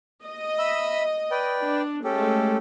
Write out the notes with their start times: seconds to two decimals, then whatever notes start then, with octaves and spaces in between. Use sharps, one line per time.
0.24 D#5
0.59 E5 B5 E6
1.31 B4 D5 G5
1.61 D4
2.04 G#3 A3 C#4 G4 A4